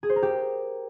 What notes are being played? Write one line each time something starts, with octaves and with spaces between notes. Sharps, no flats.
G#4
C5
A#4
G4